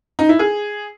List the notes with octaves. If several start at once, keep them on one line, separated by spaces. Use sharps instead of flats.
D#4
E4
G#4